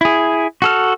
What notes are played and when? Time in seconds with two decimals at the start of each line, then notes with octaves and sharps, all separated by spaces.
0.01 E4 G#4
0.62 F#4 A4 F6